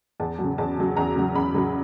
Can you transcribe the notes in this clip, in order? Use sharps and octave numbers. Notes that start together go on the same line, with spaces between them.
E2 A5
C#3 F#3
E2 A5
C#3 F#3
E2 A#5
C#3 F#3
E2 B5
C#3 F#3